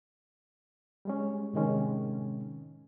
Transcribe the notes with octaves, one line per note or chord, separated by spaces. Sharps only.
G3 G#3 C#4
A2 C3 D#3 G#3 C#4